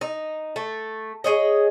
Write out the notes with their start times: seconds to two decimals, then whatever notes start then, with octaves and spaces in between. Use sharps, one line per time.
0.01 D#4
0.56 A3
1.24 G#4 C#5 D#5